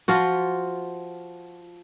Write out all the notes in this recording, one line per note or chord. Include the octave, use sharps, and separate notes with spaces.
F3 F4 F#4